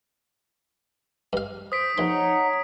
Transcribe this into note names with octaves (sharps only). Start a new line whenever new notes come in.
G2 F5
C5 D#6 B6 D7
A#1 D#4 C#5 F#5 A#5 C6